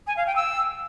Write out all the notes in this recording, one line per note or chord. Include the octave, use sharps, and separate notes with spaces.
G#5
F5
G5
E6